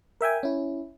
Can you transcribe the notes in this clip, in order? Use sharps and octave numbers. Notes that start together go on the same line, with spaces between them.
A#4 E5 G5 G#5
C#4 E4